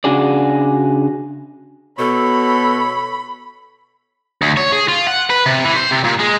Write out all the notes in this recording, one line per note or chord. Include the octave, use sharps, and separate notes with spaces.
C#3 D4 F#4 G#4 D5
B2 A4 C#5 B5
D2
C#5
G#4
F4
F#5
B4
C3
E3
C5
C3
A#2
G#3